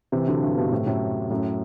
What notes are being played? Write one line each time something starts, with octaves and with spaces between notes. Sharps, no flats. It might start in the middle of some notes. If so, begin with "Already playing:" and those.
C3 E3
D3 F#3
G2
G2 B2
A2 C3
F#2 A2
F#2 A2